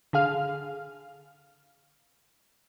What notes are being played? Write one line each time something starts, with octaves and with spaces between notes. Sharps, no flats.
D3 G#4 F5 F6